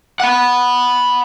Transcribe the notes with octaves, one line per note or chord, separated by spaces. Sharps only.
F#5 B5